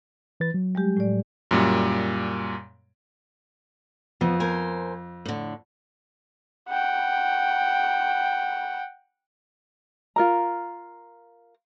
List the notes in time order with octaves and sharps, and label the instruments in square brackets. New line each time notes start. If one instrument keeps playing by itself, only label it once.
[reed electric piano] E3 B4 A6
F#3
[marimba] G3 G#3 G4
A2 D5
[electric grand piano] F#2 A#2 G3
[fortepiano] F2 [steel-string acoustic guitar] B3
[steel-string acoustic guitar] A#4 C5 G#5
A2 D3
[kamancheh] F#5 G5
[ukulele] F4 A#4 A#5